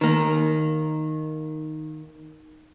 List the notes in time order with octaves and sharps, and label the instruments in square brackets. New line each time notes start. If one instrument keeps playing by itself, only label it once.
[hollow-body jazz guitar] D#3 A#3